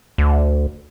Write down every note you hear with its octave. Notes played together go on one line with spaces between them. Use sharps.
D2